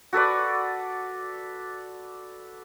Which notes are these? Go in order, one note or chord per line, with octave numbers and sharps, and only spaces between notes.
F#4 A4 B4 D5